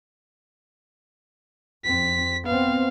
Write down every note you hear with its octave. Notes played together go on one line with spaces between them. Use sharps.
F2 C4 B6
B3 C4 F5